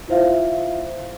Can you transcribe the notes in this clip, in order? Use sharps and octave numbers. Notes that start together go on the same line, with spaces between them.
E4 F4 C5 E5 F5